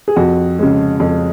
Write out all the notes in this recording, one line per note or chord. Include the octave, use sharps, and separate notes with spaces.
G#4
F2 F#4
C#3 G#3
F2